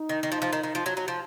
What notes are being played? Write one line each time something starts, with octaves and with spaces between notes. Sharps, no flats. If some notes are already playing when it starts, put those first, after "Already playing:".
Already playing: D#4
D#3
D#3
F3
F3
D#3
D#3
F3
F#3
F#3
F3